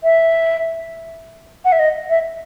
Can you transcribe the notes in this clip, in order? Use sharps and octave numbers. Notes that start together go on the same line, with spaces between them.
E5
F#5
E5
D#5
E5